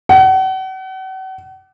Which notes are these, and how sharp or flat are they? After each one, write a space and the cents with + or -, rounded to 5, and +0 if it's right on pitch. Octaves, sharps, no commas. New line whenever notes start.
F#5 +40